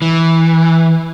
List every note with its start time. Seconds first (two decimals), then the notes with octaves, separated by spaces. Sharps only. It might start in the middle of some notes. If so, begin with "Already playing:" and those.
0.02 E3